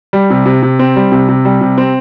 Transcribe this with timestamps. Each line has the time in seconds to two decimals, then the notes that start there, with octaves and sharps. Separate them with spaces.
0.13 G3
0.30 C3
0.46 C3
0.63 C3
0.79 C4
0.96 G3
1.12 C3
1.29 C3
1.45 G3
1.61 C3
1.78 C4